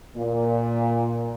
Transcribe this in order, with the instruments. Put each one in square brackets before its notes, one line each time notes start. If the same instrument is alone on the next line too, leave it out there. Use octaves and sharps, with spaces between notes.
[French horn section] A#2